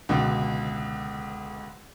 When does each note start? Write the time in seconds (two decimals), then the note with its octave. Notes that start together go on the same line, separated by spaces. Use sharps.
0.09 C#2 B2 D3